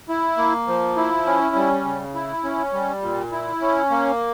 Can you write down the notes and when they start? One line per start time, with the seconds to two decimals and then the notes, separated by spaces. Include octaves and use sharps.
0.09 E4
0.38 A#3
0.67 F3
0.97 E4
1.26 C#4
1.55 G3
1.85 C#3
2.14 E4
2.44 C#4
2.73 G3
3.02 A#2
3.32 E4
3.61 C#4
3.90 A#3